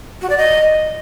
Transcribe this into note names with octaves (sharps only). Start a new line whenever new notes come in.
F#4
D5
D#5